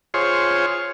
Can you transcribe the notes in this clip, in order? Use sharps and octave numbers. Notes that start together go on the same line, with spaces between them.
F4 G#4 C5 C#5